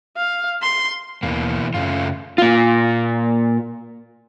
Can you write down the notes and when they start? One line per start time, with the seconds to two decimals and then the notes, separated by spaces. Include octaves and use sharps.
0.17 F5
0.62 C6
1.23 D#2 B2 E3 A#3
1.74 F#2 C#3 A3 F4
2.38 A#2 F4